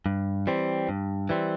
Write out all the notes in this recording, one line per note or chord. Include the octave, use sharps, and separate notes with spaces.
G2
E3 G3 C4
G2
E3 G3 C4